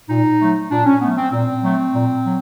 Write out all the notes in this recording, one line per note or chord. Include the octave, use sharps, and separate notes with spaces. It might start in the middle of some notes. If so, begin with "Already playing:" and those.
A#2 D#4
F#3 A3
A#2 D4
C#4
F#3 A3 B3
C4
A#2 C4
F#3 A3
A#2
F#3